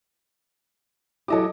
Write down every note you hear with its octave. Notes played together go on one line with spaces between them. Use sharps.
F#3 E4 G4 A4 D#5 D6